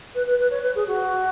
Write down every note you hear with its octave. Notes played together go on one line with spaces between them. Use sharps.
B4
B4
B4
C#5
B4
G#4
F#4